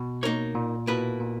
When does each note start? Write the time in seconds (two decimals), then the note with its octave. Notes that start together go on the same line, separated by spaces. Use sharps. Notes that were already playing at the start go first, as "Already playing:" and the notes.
Already playing: B2
0.23 A#3 D#4 A#4 C#5
0.55 A#2
0.87 B2 A#3 E4 B4
1.20 A#2